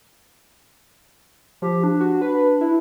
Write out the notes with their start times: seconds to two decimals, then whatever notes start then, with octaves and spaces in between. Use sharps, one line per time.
1.62 F3 G4
1.84 D4
2.00 F#4
2.22 B4
2.61 E4